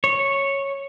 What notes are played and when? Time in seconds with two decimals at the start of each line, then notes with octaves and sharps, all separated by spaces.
0.04 C#5